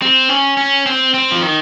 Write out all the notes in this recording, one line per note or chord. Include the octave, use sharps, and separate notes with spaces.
C4
C#4
C#4
C4
C4
F3
D#3